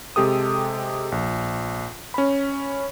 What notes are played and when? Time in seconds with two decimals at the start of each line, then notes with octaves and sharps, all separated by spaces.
0.16 C3 G#3 G4 A4 D#6
1.12 A#1
2.14 C#4 B5